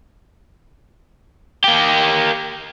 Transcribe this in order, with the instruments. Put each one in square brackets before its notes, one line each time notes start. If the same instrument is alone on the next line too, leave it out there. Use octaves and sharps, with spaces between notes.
[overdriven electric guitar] A#3 G4